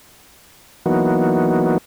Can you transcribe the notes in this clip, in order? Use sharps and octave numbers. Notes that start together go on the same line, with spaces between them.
E3 F#3 A#3 B3 D#4 F#4